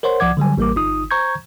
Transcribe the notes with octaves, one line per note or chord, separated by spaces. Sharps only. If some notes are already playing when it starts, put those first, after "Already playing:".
A#4 C5 C#5 F#5 C6
C2 F3 D5 F#5 D6 G#6
D3 F#3 G3 G#5
A1 G3 A#3 A#4 D6
G1 D#4 D#6
C5 A#5 C#6 G6 G#6